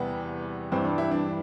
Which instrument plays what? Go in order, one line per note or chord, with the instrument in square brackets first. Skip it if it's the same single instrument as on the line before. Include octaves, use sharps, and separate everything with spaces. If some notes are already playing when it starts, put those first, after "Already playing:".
Already playing: [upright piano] E2 C3 E3 G3 [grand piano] B3
[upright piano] G2 E3 G3 [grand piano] C4
[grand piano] D4
E4
D4